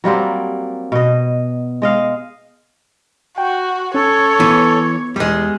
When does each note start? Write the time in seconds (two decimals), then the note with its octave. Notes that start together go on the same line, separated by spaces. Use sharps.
0.04 F#3 G3 A#3 C4
0.92 B2 D#5
1.82 G#3 D#5 F5
3.38 F#4 G5
3.94 C#4 A4 C#5
4.40 E3 B3
5.16 E2 G3 G#3